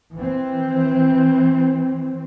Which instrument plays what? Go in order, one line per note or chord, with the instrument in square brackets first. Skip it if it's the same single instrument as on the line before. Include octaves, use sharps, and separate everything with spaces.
[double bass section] E3 C4